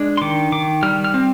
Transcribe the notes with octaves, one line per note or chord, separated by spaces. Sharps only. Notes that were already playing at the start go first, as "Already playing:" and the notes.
Already playing: G#3 D4
C6
D#3 D6
D#3 D6
G3 F6
F6
C4